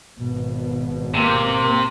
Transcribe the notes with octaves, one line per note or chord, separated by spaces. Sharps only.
G#1 B2
C3 A#3